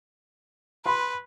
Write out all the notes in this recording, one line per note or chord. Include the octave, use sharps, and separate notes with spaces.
B4 B5 C6